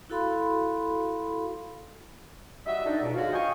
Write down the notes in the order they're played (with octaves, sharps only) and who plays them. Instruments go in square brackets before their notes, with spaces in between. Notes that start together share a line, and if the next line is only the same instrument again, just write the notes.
[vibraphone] E4 F#4 A4 F5 B5 C6
[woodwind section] G3 F#4 D#5 E5
D4 D#4 A4
C#2 B2
G#2 D3 F4 F#4 C#5 F5
D#5 F5 G5 G#5 C#6